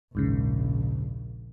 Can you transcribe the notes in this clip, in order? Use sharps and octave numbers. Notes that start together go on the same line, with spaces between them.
A#1 D#2 G#2 C#3